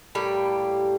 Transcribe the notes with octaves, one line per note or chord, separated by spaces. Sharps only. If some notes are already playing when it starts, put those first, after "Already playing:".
A2 G3 A#3 G4